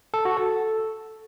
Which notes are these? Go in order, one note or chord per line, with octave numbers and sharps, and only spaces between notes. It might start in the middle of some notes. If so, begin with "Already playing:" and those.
A4
F#4
A4